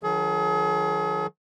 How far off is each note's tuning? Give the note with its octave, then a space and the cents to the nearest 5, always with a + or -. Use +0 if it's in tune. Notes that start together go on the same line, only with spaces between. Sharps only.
D#3 +0 F#3 -35 G#4 +35